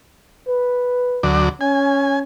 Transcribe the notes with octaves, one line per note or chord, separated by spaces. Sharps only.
B4
D2 F#3 D5
C#4 G#5